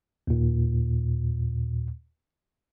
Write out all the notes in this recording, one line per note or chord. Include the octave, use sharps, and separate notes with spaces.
D#2 A#2